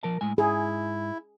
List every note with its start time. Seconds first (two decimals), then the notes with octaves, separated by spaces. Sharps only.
0.03 F3 A#4 A5
0.21 A2 G#3 G#5
0.38 G#2 E4 G#4